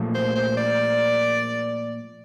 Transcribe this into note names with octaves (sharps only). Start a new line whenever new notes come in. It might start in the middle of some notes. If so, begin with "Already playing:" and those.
Already playing: A#2 F3 A3
C5
C5
D5